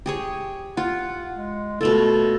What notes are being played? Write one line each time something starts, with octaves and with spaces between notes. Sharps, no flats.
G4 G#4 C#5
F4 F#5
G#3
B2 A3 F4 A4